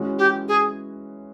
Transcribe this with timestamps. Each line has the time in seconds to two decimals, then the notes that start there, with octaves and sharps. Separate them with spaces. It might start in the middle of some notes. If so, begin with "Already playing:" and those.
Already playing: E3 G#3 C#4 F#4
0.18 G4
0.48 G#4